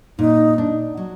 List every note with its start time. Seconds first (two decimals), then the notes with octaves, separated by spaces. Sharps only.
0.19 A#2 D#4
0.58 D4
0.97 F#3